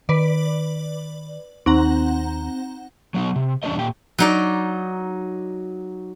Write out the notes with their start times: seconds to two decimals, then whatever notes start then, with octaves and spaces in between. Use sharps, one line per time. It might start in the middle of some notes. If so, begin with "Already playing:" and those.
0.09 D#3 B4 D5
1.66 D#2 C4 D#4 F#5 A#5
3.14 F#3 B3 C#4 D#4
3.36 C3
3.63 E2 G3 C#4 D4 B4 D#5
3.79 A#2 G4 G5
4.18 F#3 D#4 D5